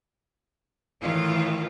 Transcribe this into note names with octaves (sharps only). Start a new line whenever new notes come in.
A2 D#3 E3 F4